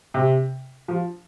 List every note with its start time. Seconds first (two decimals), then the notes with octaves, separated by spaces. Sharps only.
0.14 C3
0.88 F3